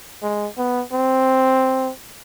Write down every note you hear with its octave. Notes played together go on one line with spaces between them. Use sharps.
G#3
B3
C4